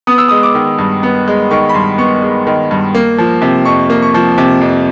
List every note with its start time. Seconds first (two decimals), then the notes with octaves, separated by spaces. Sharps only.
0.07 B3 D#6
0.18 E6
0.28 G#3 D#6
0.43 D6
0.55 D#3
0.79 G2
1.03 B3
1.28 G#3
1.51 D#3 C#6
1.69 B5
1.74 G2 C6
1.98 B3 C#6
2.22 G#3
2.47 D#3
2.71 G2
2.94 A#3
3.18 F3
3.42 C3
3.65 F2 C#6
3.90 A#3
4.02 C#6
4.14 F3
4.38 C3
4.61 F2